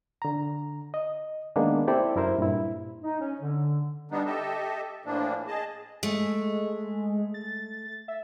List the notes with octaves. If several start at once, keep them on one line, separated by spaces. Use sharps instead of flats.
D3 A#5
D#5
D#3 G#3 A#3 B3 D4
C4 E4 G4 A4 C5 D5
F#2 E4 A#4 C5
G2 A#2 E4
D#4
C#4
D3
G3 B3 D4 D#4
G4 A4 D#5 E5
A2 E3 F3 A#3 D4
G#4 D#5 A5
G#3 A3
A6
E5